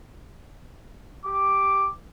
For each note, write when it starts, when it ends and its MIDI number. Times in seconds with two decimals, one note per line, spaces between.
1.25 1.89 67
1.25 1.89 86